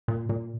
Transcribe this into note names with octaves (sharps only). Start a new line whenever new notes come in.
A#2
A#2